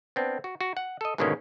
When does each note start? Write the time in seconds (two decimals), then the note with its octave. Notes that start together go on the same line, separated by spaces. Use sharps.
0.16 B3 C4 D4
0.44 F#4
0.61 F#4
0.77 F#5
1.01 A4 D#5
1.18 G#2 B2 D3 D#3 A#3 C#4